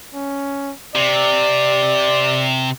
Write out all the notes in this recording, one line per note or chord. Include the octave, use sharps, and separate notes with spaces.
C#4
C3 D5